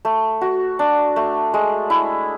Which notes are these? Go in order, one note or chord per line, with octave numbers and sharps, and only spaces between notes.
A3
F#4
D4
A3
G#3
E4